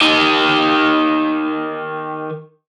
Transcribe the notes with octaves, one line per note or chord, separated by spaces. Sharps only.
D#3 G4